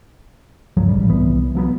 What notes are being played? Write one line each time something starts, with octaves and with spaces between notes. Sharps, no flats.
C#2 G2 F3 F#3
A1 G3
C2 E3 B3
F3 F#3 B3